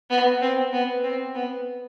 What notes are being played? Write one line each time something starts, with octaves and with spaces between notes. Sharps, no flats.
B3
C4
B3
C4
B3